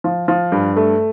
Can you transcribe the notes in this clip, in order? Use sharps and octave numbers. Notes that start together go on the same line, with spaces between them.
F3
F3
G2
A3